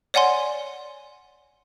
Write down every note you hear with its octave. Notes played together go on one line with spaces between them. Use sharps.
C#5 D5 F#5 G#5 C6